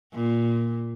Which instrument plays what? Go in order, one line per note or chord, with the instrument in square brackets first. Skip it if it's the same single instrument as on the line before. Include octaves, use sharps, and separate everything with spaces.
[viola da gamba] A#2